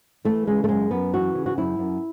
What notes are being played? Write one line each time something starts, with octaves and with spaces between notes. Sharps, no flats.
E3 A3
C#3 G#3
A3
F#2 G#3
F#2 B3
E3 F#4
C#3
F#4
F#2 E4
F#2